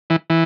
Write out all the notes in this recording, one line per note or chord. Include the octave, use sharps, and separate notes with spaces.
E3
E3